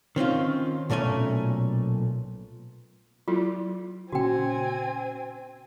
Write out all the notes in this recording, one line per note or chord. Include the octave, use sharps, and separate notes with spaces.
D#3 C4 C#4 F4
B1 A#2 A3 C#4 G#5
F#3 E4 F4
A#2 C#3 C4 C#4 F#4 G5 G#5